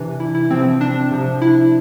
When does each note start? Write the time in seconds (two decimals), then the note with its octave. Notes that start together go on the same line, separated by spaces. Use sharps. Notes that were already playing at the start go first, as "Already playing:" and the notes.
Already playing: C3 E3 D4
0.20 E4
0.35 E4
0.50 C3 F3 C4
0.81 D4
1.11 C3 F3
1.42 E4